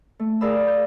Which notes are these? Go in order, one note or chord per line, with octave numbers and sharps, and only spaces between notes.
A3
G#4 A#4 D5 F5 B5 E6
G6